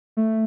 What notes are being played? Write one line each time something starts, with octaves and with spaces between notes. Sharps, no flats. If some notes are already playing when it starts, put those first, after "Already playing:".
A3